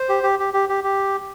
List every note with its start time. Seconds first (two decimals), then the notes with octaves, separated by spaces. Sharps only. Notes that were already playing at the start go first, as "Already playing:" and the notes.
Already playing: C5
0.09 G4
0.23 G4
0.39 G4
0.54 G4
0.69 G4
0.84 G4